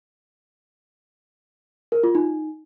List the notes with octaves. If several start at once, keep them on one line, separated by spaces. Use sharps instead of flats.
A#4
F4
D#4